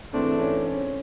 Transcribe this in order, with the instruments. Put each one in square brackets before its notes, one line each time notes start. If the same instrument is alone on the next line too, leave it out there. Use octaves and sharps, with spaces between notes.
[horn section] G#2 E3 A3 D4 [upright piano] C4
[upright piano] C#4
C#4